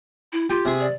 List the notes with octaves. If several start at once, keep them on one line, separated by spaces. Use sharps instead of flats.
E4
F4 G4
C3 G#4
D5